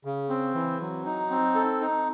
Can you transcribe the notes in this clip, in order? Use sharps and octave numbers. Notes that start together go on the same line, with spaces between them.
C#3
C4
E3
F#3
D#4
C4
A4
D#4